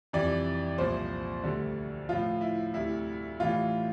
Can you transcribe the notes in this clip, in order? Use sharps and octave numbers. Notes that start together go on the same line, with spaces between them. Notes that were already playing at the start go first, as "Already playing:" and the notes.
F2 C3 E3 G3 D5
C2 A#2 F3 C5
D2 D3 G3
A2 F3 F4
E4
D2 C3 G3 E4
A2 E3 G3 F4